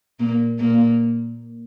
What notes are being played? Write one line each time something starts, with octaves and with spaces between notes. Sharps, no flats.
A#2 A#3
A#2 A#3